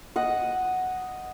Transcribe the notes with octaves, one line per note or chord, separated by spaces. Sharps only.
D#5 F#5